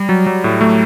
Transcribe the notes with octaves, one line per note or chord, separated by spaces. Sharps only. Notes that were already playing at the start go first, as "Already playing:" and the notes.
Already playing: G3
F#3
F#3
A2
F#3 A3